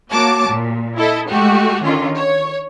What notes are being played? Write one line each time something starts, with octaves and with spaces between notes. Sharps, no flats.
A#3 F#4 C#5 A5 D6
A#2
E4 A4 D#5
G#3 A3 F#4 G4
D3 D#3 C#4 F4
C#5